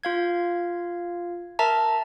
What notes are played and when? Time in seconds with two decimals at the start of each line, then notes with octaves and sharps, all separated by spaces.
0.03 F4 F5 G#6
1.59 A#4 E5 A5 A#5